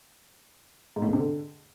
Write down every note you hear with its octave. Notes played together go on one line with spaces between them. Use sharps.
G#2
A2
E2
C3
D3